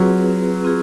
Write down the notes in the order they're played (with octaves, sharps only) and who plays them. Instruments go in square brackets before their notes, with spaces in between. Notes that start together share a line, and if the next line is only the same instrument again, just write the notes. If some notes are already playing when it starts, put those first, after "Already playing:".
Already playing: [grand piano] F#3 [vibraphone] C4 F4 G#4 B4
[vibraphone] C4 F4 G#4